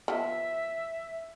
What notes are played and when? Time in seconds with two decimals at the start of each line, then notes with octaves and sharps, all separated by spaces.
0.08 F3 B3 E5